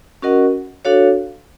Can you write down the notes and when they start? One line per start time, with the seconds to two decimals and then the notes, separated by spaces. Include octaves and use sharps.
0.22 C#4 F#4 A#4 D#5 F#5
0.85 D4 F#4 A4 C#5 F5